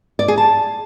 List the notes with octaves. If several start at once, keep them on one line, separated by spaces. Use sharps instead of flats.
D5
G#4
A5